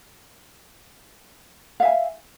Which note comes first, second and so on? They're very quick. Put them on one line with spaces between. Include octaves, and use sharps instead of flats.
F5 E5 G#5